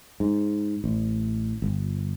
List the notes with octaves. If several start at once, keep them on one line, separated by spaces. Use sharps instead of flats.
G#2
A1
G1